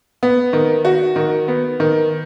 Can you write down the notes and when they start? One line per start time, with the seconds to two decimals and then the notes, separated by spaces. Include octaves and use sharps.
0.23 B3
0.53 D#3
0.85 F#4
1.16 D#3
1.48 B3
1.80 D#3